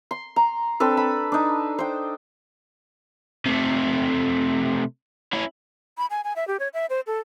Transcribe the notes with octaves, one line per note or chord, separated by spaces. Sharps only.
C6
A#5
C4 D4 A4 B4
B5
D4 D#4
C5 G5
C3 A3
C#4 E4
B5
G#5
G#5
E5
G4
C#5
E5
C5
A4